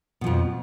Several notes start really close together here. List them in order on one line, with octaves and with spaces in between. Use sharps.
B2 F3 F2